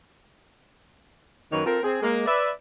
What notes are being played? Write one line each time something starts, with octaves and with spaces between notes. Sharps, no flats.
F#2 D#3 A#3 A#4 B4 C#5
C4 F4 A4 A#4
C4 G#4
G#3 A#3
B4 D5 E5